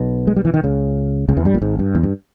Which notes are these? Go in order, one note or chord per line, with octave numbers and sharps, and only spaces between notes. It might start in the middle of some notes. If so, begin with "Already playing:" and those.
Already playing: B1 B2
G#3
G3
E3
D#3
C#2 C#3
C#2 C#3
E2 E3
G2 G3
A#1 A#2
G#1 G#2
G2
E2
G2